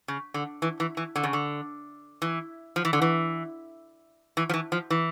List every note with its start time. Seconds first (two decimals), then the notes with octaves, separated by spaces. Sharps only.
0.08 C#3
0.34 D3
0.62 E3
0.80 E3
0.97 E3
1.16 D3
1.23 C#3
1.33 D3
2.22 E3
2.76 F3
2.85 E3
2.93 D3
3.02 E3
4.37 E3
4.49 F3
4.54 E3
4.72 F3
4.90 E3